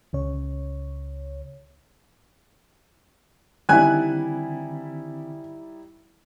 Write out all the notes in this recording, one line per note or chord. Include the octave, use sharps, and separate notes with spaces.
C#2 C#3 C#5
D3 D#3 G3 C4 D#4 E4 G#5 F#6